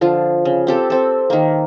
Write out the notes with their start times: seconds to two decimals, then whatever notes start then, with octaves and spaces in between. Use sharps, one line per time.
0.01 D3 F3 F4
0.45 C#3
0.67 C4 G4 A4
0.90 C4 A4
1.30 D#3 A#3